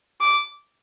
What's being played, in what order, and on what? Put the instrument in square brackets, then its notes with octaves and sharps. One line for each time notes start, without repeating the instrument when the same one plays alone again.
[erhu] D6